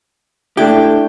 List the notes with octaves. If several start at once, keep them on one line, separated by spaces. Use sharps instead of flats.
A3 D4 E4 G4 G5